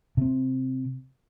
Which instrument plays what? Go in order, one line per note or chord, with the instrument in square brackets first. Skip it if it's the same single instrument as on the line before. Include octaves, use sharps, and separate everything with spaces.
[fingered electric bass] C3 C4